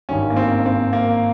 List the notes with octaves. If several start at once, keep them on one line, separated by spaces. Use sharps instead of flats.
G#1 G2 D#3 C#4
A#3
C4
C4
A#3